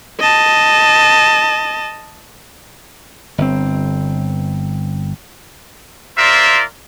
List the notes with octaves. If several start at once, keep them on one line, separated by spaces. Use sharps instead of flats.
D#5 A5
G1 C4
F4 A#4 C5 D5 E5